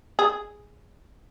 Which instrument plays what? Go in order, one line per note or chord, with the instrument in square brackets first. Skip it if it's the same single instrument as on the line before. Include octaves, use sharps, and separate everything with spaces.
[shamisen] G#4